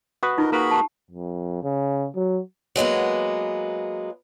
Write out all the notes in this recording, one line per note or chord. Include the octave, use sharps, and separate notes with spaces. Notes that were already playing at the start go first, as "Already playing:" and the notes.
F#4 B4 D#6
D#4 F4 A#4 D#5
A#3 F#4 G#4 A#4 B4 B5
G4 A5
F2
C#3
F#3
F#3 G#3 A#3 B3